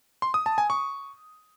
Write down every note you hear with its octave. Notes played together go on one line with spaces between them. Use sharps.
C6
D#6
A5
G#5
C#6